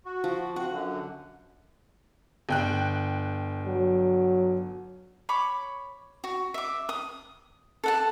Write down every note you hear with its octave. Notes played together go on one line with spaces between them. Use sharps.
F#4
F3
C4 F#4 F#5
F#2 D3
G1 G5 F#6
F#3
C#5 B5 D6
F#4
E5 D6
D#6
A4 F#5 A5